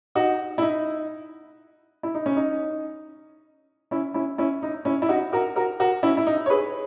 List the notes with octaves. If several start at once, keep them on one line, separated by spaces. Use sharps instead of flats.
D#4 F#4
E4
D#4
E4
D#4
C#4
D#4
C#4 E4
C#4 E4
C#4 E4
D#4
C#4 E4
E4
D#4 F#4
F#4 A#4
F#4 A#4
F#4 A#4
C#4 E4
E4
D#4
C#5
G#4 B4